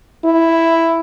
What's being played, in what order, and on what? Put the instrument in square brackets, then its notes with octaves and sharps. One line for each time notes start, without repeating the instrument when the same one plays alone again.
[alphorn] E4